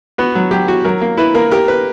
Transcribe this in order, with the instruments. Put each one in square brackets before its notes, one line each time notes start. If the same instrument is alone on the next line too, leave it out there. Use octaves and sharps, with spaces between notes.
[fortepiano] B3 [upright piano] F#4
[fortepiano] F#3
[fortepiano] F#3 [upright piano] G4
[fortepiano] F#4
[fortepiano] F#3 [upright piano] A#4
[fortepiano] A#3
[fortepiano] E4 [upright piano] B4
[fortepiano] A#3 [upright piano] A#4
[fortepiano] G4 [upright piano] A#4
[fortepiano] B4